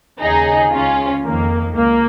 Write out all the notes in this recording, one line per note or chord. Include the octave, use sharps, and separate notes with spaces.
D#2 C#3 D#4 G#4
C#2 C#3 C#4 F4
F2 D#3 A#3
C#2 A#3